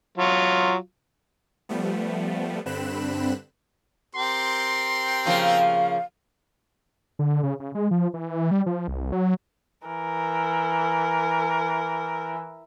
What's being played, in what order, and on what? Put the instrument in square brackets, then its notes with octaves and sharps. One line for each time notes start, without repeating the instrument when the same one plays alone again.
[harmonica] F#3 F4
[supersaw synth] F3 G3 A3 B3
G2 D3 C4 B5 F#6 E7
[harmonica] C4 G4 A#4 [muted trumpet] C6
[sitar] C#3 F3 A#3 [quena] F5
[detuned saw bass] D3
C#3
C#3
G#3
F3
E3
G3
F3
C2
F#3
[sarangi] E3 [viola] A#4